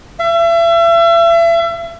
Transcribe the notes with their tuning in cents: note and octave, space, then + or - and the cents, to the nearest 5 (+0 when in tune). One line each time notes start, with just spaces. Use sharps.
E5 +35